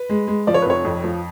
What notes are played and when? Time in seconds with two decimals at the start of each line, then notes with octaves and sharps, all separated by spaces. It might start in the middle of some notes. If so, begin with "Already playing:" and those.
Already playing: B4
0.09 G#3
0.27 G#3
0.47 F3 D5
0.54 C#5
0.62 B4
0.65 F1 C#5
0.85 F2
1.04 F3